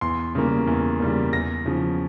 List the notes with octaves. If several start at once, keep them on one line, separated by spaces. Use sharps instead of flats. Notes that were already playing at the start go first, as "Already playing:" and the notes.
E2 C6
C#3 G3 A#3
E2
C#3 G3 A#3
E2 A#6
C#3 F3